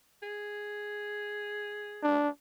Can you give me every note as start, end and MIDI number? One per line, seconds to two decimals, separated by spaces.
0.23 2.19 68
2.03 2.29 62